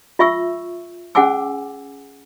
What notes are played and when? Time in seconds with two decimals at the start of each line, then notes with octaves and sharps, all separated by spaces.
0.19 F4 E5 C#6 E6
1.15 C#4 G#4 F#5 G#5 D6 E6